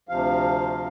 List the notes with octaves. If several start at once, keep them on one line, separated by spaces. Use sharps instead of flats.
D2 C3 F3 F5